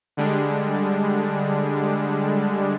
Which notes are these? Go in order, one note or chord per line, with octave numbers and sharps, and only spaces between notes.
D3 G3 G#3 D4